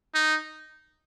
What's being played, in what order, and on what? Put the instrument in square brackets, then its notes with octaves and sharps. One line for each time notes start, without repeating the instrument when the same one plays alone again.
[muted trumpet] D#4